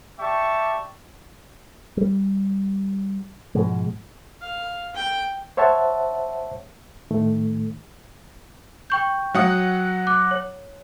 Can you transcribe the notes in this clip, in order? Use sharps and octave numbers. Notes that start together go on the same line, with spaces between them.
G4 D5 E5 G5 A5 C#6
G3
G#2 B2 F3 G#3
F5
G5
C5 C#5 E5 F#5 A5
A2 D#3 A3
G5 C#6 G6
F#3 F#5 D#6
D6 F#6
C#5